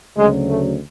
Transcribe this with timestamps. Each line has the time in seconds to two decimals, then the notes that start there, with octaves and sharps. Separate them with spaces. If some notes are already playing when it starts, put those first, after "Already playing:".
0.16 D2 C#3 F#3 G#3
0.48 A3